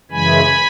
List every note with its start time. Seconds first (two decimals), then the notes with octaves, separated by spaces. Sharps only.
0.11 F#2 C#3 E3 G#3 G#5 B5